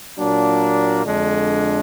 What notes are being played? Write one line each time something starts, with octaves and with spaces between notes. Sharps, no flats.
A#2 F#3 A#3 D4
F2 D3 G#3 D4